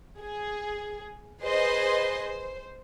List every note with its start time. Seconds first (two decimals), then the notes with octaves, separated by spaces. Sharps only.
0.19 G#4
1.43 G#4 B4 C5 D#5 C6
2.22 C5